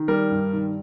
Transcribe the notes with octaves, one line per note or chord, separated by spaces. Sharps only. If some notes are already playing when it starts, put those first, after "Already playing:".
Already playing: D#3
G3 A#4
G2
D#3